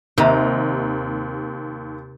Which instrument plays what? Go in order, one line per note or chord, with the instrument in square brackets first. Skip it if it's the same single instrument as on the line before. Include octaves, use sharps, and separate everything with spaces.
[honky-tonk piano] D#2 A#5 [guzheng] C3